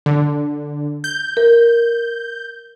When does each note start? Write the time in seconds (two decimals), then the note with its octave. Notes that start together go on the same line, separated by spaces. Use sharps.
0.06 D3
1.04 G6
1.37 A#4